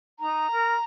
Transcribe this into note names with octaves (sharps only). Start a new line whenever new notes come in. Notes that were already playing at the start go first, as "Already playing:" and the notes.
D#4 A#5
A#4